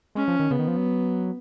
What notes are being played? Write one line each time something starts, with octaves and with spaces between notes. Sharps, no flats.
G#3 C#4
F3
D#3
C#3 B3
D#3
F3
F#3